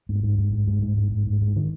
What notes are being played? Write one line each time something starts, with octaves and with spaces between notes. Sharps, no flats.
G#2
G#2
G#2
G#2
G#2
G#2
G#2
G#2
G#2
G#2
D#3